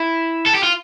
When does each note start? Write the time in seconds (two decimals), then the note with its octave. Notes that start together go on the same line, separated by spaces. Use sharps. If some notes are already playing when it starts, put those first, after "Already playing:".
Already playing: E4
0.46 A4
0.55 G4
0.63 F4